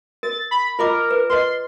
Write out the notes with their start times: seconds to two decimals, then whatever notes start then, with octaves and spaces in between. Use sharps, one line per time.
0.23 A#4 A6
0.51 B5
0.79 F4 A#4 D#5 D6
1.11 B4
1.30 B4 D#5 C6